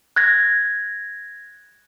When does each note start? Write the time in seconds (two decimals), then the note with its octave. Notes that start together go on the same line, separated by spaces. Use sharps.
0.16 F#6 G#6 A#6